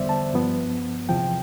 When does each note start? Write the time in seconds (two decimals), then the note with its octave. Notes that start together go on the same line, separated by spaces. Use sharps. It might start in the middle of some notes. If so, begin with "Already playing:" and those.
Already playing: E2 D3 G3 B3 C5 D5 E5
0.09 A5
0.34 G2 F3 B3
1.09 E2 C3 F3 G5